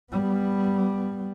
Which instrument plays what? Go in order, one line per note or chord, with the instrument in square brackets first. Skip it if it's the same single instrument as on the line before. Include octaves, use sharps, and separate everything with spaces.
[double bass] G3 B3